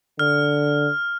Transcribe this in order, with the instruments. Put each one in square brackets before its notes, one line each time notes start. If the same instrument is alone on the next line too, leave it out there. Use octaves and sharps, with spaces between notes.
[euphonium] D3 [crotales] F6